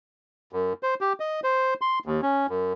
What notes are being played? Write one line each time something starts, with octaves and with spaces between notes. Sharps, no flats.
F#2
C5
G4
D#5
C5
C6
D#2
C#4
F#2